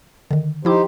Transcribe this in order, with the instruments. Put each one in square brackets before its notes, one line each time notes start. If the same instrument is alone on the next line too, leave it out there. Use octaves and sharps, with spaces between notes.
[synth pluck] D3 D#3
[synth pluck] F3 E4 D6 [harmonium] D#4 G4 C5